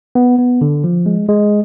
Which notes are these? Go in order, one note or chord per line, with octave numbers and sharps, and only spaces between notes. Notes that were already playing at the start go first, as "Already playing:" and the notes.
B3
B3
D3
F3
G#3
G#3